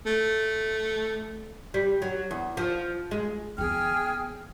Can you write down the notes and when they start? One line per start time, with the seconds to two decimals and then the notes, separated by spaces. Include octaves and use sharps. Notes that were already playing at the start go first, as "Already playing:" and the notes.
0.06 A3
1.74 G3
2.02 F#3
2.31 E2
2.57 F3
3.11 G#3
3.58 E3 B3 G#4 G5 F6